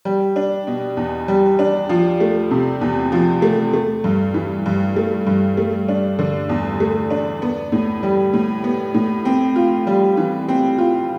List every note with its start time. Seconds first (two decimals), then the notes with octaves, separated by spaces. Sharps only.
0.05 G3
0.36 D4
0.67 B2
0.97 E2
1.28 G3
1.59 D4
1.89 F3
2.20 A3
2.51 C3
2.81 E2
3.12 F3
3.42 A3
3.73 A3
4.04 G2
4.34 E3
4.66 G2
4.96 A3
5.27 G2
5.57 A3
5.88 D4
6.19 D3
6.49 E2
6.80 A3
7.11 D4
7.42 B3
7.72 A2
8.03 G3
8.33 A2
8.64 B3
8.94 A2
9.25 C4
9.56 F4
9.87 G3
10.17 E3
10.49 C4
10.78 F4